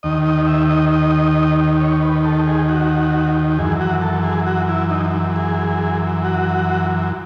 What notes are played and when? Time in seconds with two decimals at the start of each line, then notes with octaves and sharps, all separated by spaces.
0.03 D#2 D#3 D#5
0.25 D#5
0.48 E5
0.69 D#5
0.92 D#5
1.81 C#5
2.03 B4
2.25 A4
2.47 G#4
2.69 F#4
3.58 F#2 E3 G#4
3.81 F#4
4.02 A4
4.24 G#4
4.47 F#4
4.69 E4
4.91 D#4
5.36 G#4
6.25 F#4